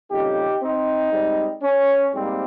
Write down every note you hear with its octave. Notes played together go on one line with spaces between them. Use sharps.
F2 C#3 G3 D#4 G4
C4 D#4
G#2 G3 C4
C#4
G#2 G3 A#3 C4